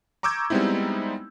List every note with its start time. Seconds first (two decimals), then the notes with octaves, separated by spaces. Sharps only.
0.23 A#5 C#6 D6 E6 G6 G#6
0.50 G3 G#3 B3 C4 D#4 E4